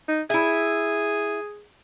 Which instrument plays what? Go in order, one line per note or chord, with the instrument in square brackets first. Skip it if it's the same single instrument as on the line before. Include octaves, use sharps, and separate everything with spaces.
[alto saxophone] D#4
[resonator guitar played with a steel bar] E4 E5 [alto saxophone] G#4